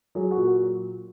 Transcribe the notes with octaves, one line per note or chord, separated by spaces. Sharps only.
F#3 G#4
F#4
A#2
F#4